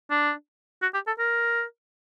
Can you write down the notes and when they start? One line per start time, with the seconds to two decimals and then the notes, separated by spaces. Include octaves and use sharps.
0.11 D4
0.82 F#4
0.94 G4
1.07 A4
1.19 A#4